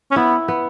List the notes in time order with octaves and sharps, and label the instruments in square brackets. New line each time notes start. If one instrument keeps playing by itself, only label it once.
[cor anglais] C#4
[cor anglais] B3 [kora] E4
[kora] B3